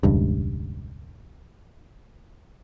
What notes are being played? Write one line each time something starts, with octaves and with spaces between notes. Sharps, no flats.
E1 C#2 G2